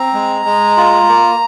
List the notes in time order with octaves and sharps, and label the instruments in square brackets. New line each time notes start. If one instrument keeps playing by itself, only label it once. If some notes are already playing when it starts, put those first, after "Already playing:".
Already playing: [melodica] C4 A#5
G#3
G#3
F4
A#3